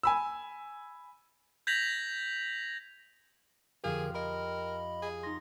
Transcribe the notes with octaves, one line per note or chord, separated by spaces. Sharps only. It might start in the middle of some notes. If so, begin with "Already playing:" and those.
G#5 B5 E6
G6 G#6 A#6 B6 F7 F#7
F2 D3 G4 G#4 A#4 F5
A#4 D#5 B5
G#4
D#4 C6 A#6